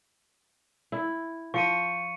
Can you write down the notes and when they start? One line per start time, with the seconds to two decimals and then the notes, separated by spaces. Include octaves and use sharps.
0.92 E4
1.54 F3 C#6 C#7 D#7